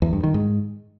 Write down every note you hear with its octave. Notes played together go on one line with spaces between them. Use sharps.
E2
G2
D#3
G#2